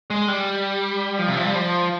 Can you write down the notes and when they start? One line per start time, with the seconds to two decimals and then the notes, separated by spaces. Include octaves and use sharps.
0.10 G#3
0.28 G3
1.19 F3
1.28 C3
1.37 F3
1.46 G3
1.55 F3